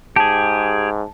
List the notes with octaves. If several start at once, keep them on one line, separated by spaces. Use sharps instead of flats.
G#2 G4 G#4 A5